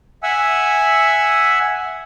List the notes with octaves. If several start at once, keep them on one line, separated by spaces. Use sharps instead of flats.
E5 F#5 G#5 E6